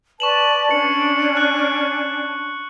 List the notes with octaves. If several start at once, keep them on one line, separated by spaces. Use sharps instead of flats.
B4 D5 A5 C#6 E7 F#7
C#4 D4 C#7
F#6